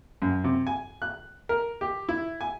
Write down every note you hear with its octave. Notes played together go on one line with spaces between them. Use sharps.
F#2
C3
G#5
F#6
A#4
G4
E4
G#5